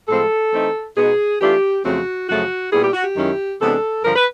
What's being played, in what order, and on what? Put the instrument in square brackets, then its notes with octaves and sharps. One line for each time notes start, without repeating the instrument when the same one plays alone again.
[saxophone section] A2 F3 G#3 C4 A4
E3 A3 C4 D#4
B2 G#3 B3 D#4 G#4
E3 A3 D4 F4 G4
F2 C#3 F#3 A3 C4 F#4
F#2 C#3 F3 A3 F#4
A#2 G3 B3 E4 G#4
G4
F#4
G4
F#2 D#3 G#3 C#4 E4
C3 E3 G#3 B3 D4 A4
G2 D3 F3 A#4
B4